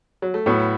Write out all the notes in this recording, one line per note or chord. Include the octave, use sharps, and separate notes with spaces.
F#3
A3
A2 F#3 B3